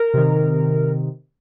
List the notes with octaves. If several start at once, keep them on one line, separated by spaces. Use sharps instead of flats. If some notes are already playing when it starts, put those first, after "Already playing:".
Already playing: A#4
C3 D#3